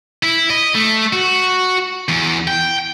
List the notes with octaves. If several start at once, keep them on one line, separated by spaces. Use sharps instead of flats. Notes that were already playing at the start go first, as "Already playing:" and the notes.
E4
D#5
A3
F#4
E2
G5